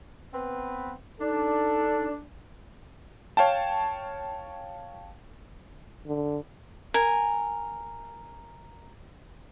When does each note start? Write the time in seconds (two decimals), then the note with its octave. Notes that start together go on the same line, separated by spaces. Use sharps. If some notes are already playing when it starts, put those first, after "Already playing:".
0.33 B3 C4 B4
1.20 D4 D#4 A4
3.37 C#5 F5 G5 A5
6.06 D3
6.94 A#4 G#5